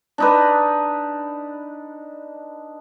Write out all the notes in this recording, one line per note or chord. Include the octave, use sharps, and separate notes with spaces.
D4 D#4 B4